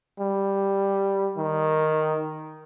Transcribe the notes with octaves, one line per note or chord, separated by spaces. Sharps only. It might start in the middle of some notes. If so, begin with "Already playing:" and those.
G3
D#3